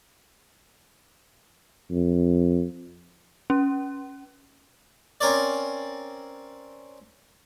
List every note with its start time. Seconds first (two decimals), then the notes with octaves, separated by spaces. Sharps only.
1.91 F2
3.50 C#4
5.21 C4 C#4 A#4 C#5 D5